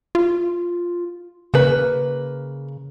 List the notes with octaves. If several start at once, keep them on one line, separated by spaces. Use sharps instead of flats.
F4
C#3 A#3 B4